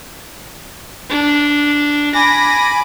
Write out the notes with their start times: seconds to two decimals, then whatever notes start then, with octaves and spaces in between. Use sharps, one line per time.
1.09 D4
2.14 G#5 B5 D6 A#6